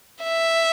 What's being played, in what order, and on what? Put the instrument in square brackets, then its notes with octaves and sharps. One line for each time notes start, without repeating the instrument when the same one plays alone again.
[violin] E5